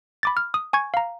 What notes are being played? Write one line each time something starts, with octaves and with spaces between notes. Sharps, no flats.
B5 D6 A6
F6
D#6
G#5 C#6 G#6
F5 A#5